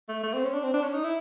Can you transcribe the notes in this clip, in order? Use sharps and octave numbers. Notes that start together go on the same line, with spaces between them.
A3
A3
C4
C#4
D4
C4
D4
C#4
D#4
E4